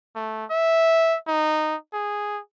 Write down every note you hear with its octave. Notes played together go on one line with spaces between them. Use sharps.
A3
E5
D#4
G#4